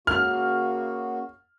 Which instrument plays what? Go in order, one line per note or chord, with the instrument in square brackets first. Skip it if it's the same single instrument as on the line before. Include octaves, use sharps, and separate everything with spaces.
[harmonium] C#3 A#3 F#4 [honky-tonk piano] F6